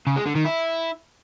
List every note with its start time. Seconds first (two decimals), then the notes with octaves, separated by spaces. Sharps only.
0.07 C#3
0.16 G#3
0.26 D3
0.35 D#3
0.45 E4